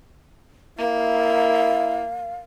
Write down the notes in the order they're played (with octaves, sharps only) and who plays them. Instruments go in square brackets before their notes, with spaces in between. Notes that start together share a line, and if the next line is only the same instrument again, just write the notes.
[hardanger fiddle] A#3 [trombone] E4 [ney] F5